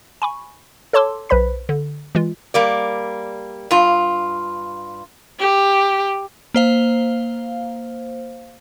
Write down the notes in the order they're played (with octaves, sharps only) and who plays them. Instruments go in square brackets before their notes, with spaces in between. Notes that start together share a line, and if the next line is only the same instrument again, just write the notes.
[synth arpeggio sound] G#5 B5 C#6
A4 C#5 A5 C6 D6 E6
B1 B4 C5 B5 B6
D3
E3 G#3 F4
[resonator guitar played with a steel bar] G3 A#3 D5
G2 F4
[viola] G4
[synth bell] A#3 C5 F5